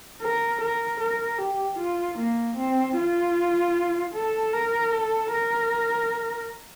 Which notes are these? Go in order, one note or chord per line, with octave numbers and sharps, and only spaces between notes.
A#4
A#4
A#4
G4
F4
A#3
C4
F4
A4
A#4
A4
A#4